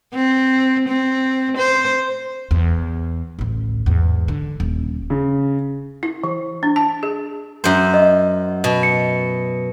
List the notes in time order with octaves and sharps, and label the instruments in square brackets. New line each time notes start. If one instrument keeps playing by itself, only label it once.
[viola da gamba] C4
C4
C5
[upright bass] E2
A1 D2
E2 G#2
D3
D#1
[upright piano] C#3
[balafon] E4
E3
D4
A5
G#4
[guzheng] F#2 C5
[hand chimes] D#5
[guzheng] B2
[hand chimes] C#7